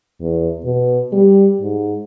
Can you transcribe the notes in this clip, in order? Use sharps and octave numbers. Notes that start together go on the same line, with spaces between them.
E2
B2
G3
G#2